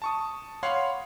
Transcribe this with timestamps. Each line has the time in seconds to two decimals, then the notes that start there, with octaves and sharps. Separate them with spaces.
0.02 A5 C#6 D#6
0.63 C#5 F5 F#5 B5 C6